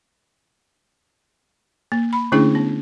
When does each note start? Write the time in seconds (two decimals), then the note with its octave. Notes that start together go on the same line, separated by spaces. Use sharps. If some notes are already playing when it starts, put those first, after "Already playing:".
1.92 A#3
2.13 B5
2.32 D3 A3 C#4 D4 E4 G#4
2.55 B3